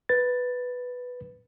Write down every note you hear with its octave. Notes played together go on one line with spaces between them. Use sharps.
B4 A6